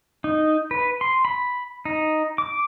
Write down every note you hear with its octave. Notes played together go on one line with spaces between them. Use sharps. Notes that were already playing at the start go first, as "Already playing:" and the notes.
D#4
B4
C6
B5
D#4
D6